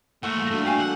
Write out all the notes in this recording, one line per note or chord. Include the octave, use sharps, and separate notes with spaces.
G#2 A3 A#3 F#4 F#5
E3 G3 G#4
G2 E3 D4 F#4 A4
D4 G4 F5 G#5
E3 A4 F#5